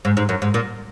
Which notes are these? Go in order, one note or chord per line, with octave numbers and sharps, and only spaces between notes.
G#2
G#2
F#2
G#2
A#2